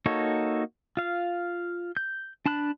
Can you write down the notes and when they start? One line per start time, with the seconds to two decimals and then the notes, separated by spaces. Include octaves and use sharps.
0.06 A#3 D#4 F#4 A4 C#5
0.97 F4 F5
1.97 G6
2.46 D4 A5 B5 F#6